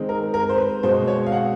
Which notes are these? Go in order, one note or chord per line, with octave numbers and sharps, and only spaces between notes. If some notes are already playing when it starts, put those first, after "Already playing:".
Already playing: D#3 G#3 C4
A#4
A#4
C5
B4
B2 G#3 C4 C5
C#5
F5
F#5